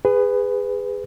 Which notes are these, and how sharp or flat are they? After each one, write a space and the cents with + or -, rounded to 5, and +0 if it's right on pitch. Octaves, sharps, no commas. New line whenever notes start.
G#4 -20 B4 +15